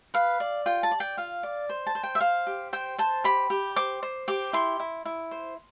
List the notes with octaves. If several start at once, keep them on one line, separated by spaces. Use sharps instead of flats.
B4 F5
D5
F4 G5
A5
D5
G5
F4 F5
D5
C5
A5
C5
G5
E5
C5 F5
G4
C5 G5
C5 A5
G4 B5
G4
C5 D6
C5
G4 D6
E4 C6
E4
E4
C5